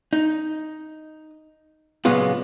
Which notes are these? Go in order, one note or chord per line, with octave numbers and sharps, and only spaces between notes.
D#4
A#2 C#3 F#3 G#3 B3 F4